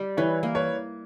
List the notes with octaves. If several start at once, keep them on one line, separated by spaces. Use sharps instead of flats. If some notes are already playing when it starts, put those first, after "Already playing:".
Already playing: G3
E3 B4 C#5
A#3
B4 C#5